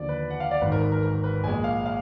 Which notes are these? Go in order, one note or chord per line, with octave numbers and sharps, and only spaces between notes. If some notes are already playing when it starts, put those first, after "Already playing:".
Already playing: D#2 D3 F3 D5
B4
F#5
F5
D5
G#1 G#2 D#3 B4
A#4
B4
A#4
A#4
B4
A#1 A#2 G#3 G#5
F5
F5